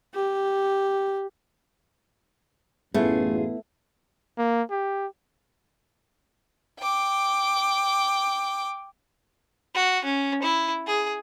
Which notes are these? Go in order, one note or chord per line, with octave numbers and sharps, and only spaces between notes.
G4
A1 F#2 A3 B3 E4 F4 G#4
A#3
G4
G5 D6
F#4
C#4
E4
G#4